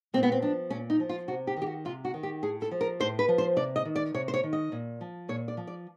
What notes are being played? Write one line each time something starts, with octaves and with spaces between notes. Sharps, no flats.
A#2 C4
B3
C4
F3 D4
A#2 C#4
D#4
F3
F4
C3 F#4
G4
D#3
G4
F#4
C3 F4
F#4
D#3
G4
A2 G#4
A4
F3
A#4
A2 C5
B4
F3
C5
C3 D5
D#5
D#3
D5
C3 C#5
C5
C#5
D#3
D#5
A#2
F3
A#2 C#5
D5
F3
D5